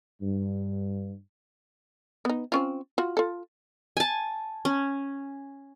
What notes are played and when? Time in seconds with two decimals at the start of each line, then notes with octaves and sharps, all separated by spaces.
0.22 G2
2.25 B3 D#4
2.52 C4 C#4 F4
2.98 F4 F#4
3.17 F4 A4
3.97 G#5 A5
4.65 C#4